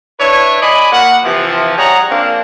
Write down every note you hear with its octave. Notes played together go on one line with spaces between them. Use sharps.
D4 E4 B4 C#5
D5 D#5 G#5 B5
A#3 F#4 F#5
C3 E3 F3
G3 G#4 C#5 F#5 A#5
F3 A#3 C4 D4